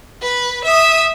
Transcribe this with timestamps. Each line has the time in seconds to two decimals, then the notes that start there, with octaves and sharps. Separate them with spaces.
0.23 B4
0.64 E5 D#6